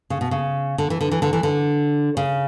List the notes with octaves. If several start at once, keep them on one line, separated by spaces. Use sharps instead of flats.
C#3
B2
C#3
D3
E3
D3
E3
D3
E3
D3
C#3